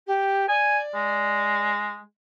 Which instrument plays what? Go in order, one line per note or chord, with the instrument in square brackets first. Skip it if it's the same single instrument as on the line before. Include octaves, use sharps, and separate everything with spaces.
[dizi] G4
[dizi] D5 [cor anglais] G#5
[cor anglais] G#3